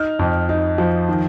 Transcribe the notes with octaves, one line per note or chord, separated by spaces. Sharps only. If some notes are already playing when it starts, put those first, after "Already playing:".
Already playing: D#4 F6
F2
D#4
F3
D#3